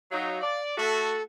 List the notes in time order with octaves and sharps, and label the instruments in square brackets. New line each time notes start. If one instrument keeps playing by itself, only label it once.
[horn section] F#3 D#4 [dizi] F5
[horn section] D5
[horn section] A3 F#4 [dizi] A4